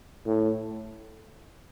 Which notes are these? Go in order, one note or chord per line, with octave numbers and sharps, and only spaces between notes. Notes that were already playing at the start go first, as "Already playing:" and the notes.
A2